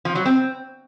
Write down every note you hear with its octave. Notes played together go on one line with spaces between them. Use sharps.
F3
F#3
C4